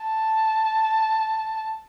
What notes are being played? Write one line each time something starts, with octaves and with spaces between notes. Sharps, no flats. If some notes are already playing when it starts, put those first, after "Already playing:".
Already playing: A5